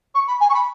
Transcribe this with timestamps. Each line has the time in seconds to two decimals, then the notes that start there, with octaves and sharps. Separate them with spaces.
0.14 C#6
0.27 B5
0.40 G#5
0.49 C#6
0.53 B5